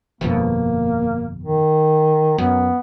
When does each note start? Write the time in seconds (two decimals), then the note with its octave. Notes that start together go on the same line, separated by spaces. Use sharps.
0.21 G1 F2 B2 A#3
1.43 D#3
2.38 F#2 B3